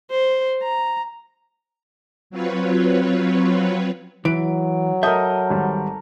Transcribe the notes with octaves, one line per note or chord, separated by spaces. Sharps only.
C5
A#5
F#3 C4 F4 B4 C#5
E3 F#3 D7
A4 A#4 D#5 E5 D#6 G6
G#1 G3